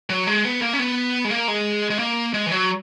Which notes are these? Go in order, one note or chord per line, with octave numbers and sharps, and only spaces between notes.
F#3
G#3
B3
A#3
C#4
B3
G#3
A#3
G#3
G#3
A#3
G#3
E3
F#3